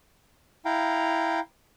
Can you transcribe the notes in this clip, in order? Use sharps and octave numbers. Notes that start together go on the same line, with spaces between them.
E4 F5 G5 A#5